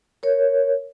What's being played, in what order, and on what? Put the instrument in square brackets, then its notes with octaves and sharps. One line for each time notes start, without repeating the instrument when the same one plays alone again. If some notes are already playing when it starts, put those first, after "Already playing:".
[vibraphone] A#4 C#5